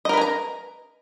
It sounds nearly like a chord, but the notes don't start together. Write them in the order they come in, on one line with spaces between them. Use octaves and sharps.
D#5 A#4 B4 G#5 A#5